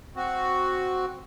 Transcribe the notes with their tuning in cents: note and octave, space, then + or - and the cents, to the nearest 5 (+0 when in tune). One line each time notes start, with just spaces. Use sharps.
C4 +0 F#4 +0